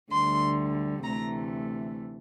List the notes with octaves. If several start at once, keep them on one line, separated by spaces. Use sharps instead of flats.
D2 D3 G3 C6
D2 C3 E3 A3 A#5